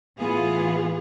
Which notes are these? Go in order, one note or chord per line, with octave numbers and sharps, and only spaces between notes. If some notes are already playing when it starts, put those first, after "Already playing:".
A2 E3 B3 F4 G#4